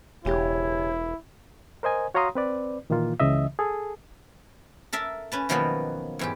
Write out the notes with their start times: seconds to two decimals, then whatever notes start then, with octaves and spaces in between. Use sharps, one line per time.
0.25 E1 C#3 E4 G4 C#5
1.83 A#4 C5 D#5 G#5
2.14 F#4 C#5 F5 A#5 C6 D#6
2.35 C4 B4 D5
2.90 A#2 D#3 E3 A#3 F4
3.20 C#2 C#3 E3 D#5 E5
3.59 G#4 A4
4.93 A4 A#4 E5 A5
5.32 C#4 B4 A5
5.49 B2 D#3 F3 F#3 A#3 B3
6.19 E2 G#2 G4